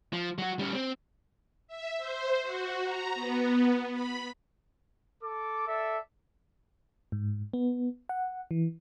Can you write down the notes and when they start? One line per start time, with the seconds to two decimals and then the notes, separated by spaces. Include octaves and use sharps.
0.13 F3
0.38 F#3 F#4
0.59 G3 C#4
0.74 C4
1.68 E5
1.97 C5
2.42 F#4
2.84 A#5
3.14 B3
3.90 B5
5.23 A4 D6
5.66 A4 D5 E5
7.12 G#2
7.53 B3
8.09 F#5
8.51 E3